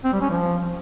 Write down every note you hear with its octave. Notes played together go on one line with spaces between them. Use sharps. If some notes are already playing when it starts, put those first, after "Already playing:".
C4
G3
C#4
F3